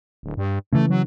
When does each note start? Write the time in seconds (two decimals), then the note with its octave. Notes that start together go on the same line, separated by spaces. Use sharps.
0.23 D1
0.37 G2
0.73 C#3 E3 A3
0.90 F#3